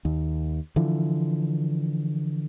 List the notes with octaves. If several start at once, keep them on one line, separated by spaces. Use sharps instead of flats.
D#2
D3 E3 F3